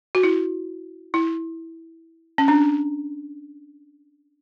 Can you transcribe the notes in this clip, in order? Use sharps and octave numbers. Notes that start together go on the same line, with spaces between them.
F#4
E4
E4
C#4
D4